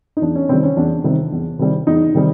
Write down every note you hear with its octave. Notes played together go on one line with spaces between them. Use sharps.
D#4
E2 D4
C#4
C3 D#3 G3 C4
C#4
E2 D4
C3 D#3 G3
E2
C3 D#3 G3
E2 D#4
C3 D#3 G3